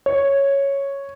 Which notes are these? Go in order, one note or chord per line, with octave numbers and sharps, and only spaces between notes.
C#5